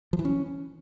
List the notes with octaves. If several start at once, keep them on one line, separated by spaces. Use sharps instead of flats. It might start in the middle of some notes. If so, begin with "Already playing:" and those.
F3
E3
C#4